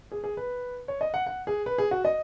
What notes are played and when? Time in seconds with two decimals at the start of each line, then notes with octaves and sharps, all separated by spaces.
0.12 G#4
0.24 G#4
0.37 B4
0.88 C#5
1.01 D#5
1.14 F#5
1.27 F#5
1.47 G#4
1.66 B4
1.78 G#4
1.91 F#4
2.05 D#5